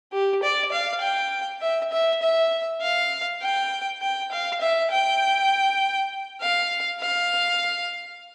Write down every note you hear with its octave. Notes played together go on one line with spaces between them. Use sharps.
G4
D5
F5
G5
E5
E5
E5
F5
G5
G5
F5
E5
G5
F5
F5